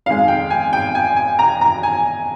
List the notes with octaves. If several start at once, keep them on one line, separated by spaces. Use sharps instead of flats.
F2 D#3 G#3 F5
G5
G#5
G5
G#5
G#5
A#5
A#5
G#5